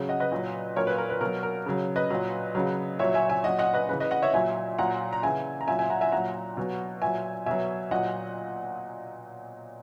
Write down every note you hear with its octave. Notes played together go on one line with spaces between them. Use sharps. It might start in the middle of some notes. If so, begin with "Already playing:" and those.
Already playing: C#3 F#3
D#5 F#5
B4 D#5
A#2 F#3
A#2 F#3 A#4 C#5
B4
A#4
B4
B2 F#3 A#4
A#4
C#3 F#3
B4 D#5
A#2 F#3
C#3 F#3
A#2 F#3 C#5 E5
E5 G#5
E5 G#5
A#2 F#3 D#5 F#5
D#5 F#5
B4 D#5
C#3 E3 B4
B4 D#5
D#5 F#5
C#5 E5
A#2 F#3 E5 G#5
A#2 F#3 F#5 A#5
A#5
C#3 E3 E5 G#5
A#5
A#2 F#3 E5 G#5
E5 G#5
F#5 A#5
E5 G#5
A#2 F#3 F#5 A#5
B2 F#3
A#2 F#3 E5 G#5
B2 F#3 E5 G#5
A#2 F#3 D#5 F#5